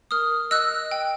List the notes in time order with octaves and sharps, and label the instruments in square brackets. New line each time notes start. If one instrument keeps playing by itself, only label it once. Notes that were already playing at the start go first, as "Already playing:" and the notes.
[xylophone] A#4 D#6 F6
D#5 E6 F#6
G5